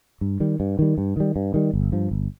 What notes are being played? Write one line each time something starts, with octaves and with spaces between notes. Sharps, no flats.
G2
D#3 G3
G2
D#3 G3
G2
D#3 G3
G2
D#3 G3
G1
G2 F3
G1